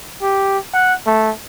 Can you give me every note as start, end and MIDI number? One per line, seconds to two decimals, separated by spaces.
0.22 0.58 67
0.74 0.95 78
1.07 1.31 57